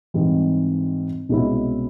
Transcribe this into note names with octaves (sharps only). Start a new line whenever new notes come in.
G#2 E3 G3 C4
C2 B2 G#3 C#4 E4